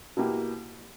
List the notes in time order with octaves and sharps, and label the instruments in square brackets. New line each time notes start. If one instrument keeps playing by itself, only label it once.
[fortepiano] B2 A#3 E4 G4